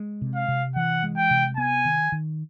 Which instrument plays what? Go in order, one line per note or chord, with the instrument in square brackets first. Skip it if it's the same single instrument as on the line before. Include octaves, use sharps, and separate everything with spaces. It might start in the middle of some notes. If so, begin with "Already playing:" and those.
Already playing: [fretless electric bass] G#3
C3
[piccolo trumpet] F5
[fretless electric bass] C3
[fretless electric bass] E3 [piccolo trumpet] F#5
[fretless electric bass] G#3
[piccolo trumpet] G5
[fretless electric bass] C3
[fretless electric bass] B3 [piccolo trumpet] G#5
[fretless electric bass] D#3
D#3